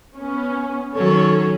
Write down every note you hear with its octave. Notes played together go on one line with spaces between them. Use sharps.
B3 C#4
D#3 F#3 C#4 A4 C#5